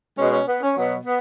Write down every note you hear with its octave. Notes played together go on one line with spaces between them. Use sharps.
B2 G#3 C#4
C#4
B3
C#4
B2 F#3 B3
B3